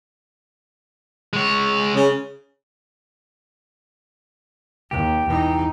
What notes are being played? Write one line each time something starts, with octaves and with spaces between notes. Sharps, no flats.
G#3 C#5
C#3
D#2 G4
E2 D#4